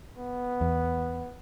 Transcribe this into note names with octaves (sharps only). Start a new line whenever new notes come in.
B3
E2